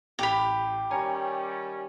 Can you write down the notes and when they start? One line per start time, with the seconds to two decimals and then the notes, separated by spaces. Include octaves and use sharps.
0.19 A1 G4 B5 F7
0.90 D#3 G3 C#4 C#5 G#5 A#5